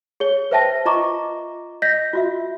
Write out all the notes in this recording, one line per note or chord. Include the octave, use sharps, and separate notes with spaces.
G#4 C#5 G7
B4 C5 E5 G5 A5 A#6
F4 D#5 A#5 C#6 D6
D#5 G6 A#6 B6
F4 F#4 E5